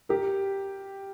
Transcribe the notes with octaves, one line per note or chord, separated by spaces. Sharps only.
G4 A#4